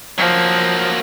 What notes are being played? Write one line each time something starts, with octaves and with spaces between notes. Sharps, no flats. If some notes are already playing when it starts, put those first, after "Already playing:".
F3 F#3 A#3